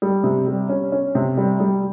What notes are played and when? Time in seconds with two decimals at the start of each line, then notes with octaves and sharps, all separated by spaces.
0.02 G3
0.24 C3
0.47 G3
0.69 C#4
0.92 C#4
1.15 C3
1.37 G3
1.60 G3